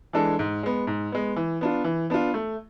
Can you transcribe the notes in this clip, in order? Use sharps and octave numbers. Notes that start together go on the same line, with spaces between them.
E3 G#3 D4 A4
G#2
G#3 B3
G#2
G#3 B3
E3
B3 D4 F4
E3
B3 D4 F4
A3